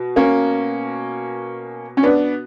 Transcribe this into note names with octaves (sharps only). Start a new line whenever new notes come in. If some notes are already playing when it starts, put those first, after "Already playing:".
Already playing: B2
A#3 C#4
C#4
B3 D4